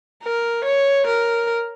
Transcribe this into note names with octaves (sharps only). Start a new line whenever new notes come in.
A#4
C#5
A#4